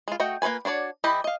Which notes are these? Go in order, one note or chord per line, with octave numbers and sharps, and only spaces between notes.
G#3 F4
A3 F#4 D#5 G5
A#3 F4 A4 B4 G#5
D4 F#4 C#5 D5
E3 E4 G4 D#5 B5
D#5 F5